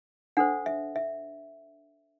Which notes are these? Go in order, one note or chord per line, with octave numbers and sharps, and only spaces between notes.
D4 A4 C5 F#5
E5
E5